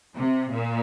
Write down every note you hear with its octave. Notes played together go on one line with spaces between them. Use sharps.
C3
A#2